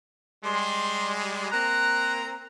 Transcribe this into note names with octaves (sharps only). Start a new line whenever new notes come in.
G3 G#3 C6
A#3 C4 A#5 F#6